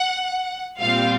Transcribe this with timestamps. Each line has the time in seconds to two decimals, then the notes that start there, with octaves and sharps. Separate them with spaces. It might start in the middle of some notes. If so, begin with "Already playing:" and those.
Already playing: F#5
0.80 A#2 G3 C4 F4 F5